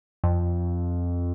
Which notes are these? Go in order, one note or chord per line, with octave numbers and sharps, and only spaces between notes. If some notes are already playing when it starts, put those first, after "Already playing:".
F2